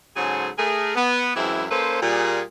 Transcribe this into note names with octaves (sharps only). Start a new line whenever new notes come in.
G#2 C#3 F#3 G#4 A4 C5
A3 G#4 A#4
B3
F#2 E3 G#3 C4 E4
A#3 C#4 A4 B4 C5
A#2 G3 G#4